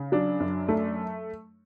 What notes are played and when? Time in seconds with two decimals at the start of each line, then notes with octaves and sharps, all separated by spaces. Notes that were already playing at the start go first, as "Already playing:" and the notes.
Already playing: C#3
0.12 F#3 D4
0.40 F#2
0.68 A3